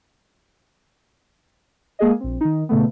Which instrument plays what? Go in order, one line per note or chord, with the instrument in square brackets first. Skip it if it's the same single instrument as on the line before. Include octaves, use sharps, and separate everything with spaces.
[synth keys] G#3 A#3 G#4 D#5
A#1 C4
D#3 D#4
A#2 C#3 A3 B3